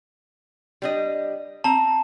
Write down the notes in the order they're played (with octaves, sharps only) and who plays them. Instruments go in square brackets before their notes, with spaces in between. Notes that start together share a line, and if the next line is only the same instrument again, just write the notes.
[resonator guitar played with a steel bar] G3 D4 D#5
[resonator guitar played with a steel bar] C4 A#5 [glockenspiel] A5